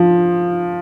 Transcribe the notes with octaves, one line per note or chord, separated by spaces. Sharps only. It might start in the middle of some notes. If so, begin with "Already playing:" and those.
Already playing: F3